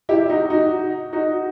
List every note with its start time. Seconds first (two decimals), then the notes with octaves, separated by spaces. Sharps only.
0.09 E4 G4
0.30 D#4 F#4
0.50 D#4 F#4
1.13 D#4 F#4